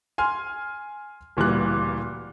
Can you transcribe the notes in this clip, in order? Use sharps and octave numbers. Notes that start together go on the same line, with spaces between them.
G#5 C6 F6
D1 A#2 E3 G3 F#6